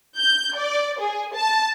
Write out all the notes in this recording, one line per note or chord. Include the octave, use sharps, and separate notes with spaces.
G6
D5
G#4
A5